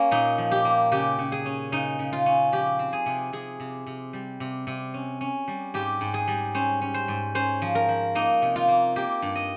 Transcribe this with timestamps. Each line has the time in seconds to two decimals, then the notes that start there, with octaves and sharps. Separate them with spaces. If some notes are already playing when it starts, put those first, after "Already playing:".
Already playing: A#3 C#4
0.11 A#2 D#4
0.38 F3
0.51 G4
0.65 A#3
0.92 C#3 G4
1.19 C#3
1.32 G#4
1.46 C#4
1.72 C#3 D#4
1.99 C#3
2.13 F4
2.26 C#4
2.52 F3 G4
2.79 C4
2.93 G#4
3.06 C3
3.33 C3 G#4
3.60 C3
3.87 C3
4.13 G3
4.40 C3
4.67 C3
4.94 C#4
5.21 C#4
5.48 G3
5.74 G#2 G4
6.01 G#2
6.14 G#4
6.28 G3
6.55 C#4 C5
6.82 C#4
6.94 C5
7.08 G#2
7.35 C#4 C5
7.62 F3
7.75 A#4
7.89 F3
8.15 A#3 D#4
8.42 C3
8.56 F4
8.68 A#3
8.96 A#3 G4
9.22 G2
9.36 D#5